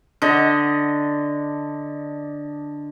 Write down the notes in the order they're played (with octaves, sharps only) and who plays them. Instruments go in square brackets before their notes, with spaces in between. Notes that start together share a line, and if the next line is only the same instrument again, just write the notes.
[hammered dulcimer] D3 D#5